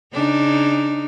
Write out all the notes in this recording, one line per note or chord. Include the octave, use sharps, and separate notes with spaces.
C#3 D4 D#4